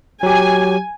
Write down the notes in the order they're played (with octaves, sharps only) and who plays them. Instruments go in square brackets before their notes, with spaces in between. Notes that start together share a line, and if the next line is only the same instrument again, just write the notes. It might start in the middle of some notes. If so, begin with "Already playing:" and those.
[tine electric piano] F#3 G4 [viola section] G#5